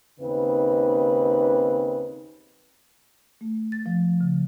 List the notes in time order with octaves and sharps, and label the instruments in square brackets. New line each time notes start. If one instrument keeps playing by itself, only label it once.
[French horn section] D#2 C#3 C4 D#4 B4
[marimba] A3
A6
F3
C#3